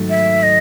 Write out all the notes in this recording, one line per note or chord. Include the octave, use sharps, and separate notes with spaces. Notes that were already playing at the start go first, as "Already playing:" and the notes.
Already playing: G#2 D#3 F#3 A3
E5
D#5